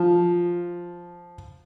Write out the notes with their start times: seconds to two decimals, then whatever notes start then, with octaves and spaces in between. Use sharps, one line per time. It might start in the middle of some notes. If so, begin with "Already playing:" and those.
Already playing: F3